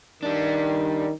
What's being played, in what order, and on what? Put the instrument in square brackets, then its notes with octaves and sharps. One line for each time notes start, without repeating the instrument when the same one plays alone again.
[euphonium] D#3 [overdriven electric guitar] G3 D4